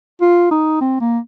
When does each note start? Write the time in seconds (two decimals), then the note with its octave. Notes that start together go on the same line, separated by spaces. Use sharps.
0.21 F4
0.51 D#4
0.81 C4
1.01 A#3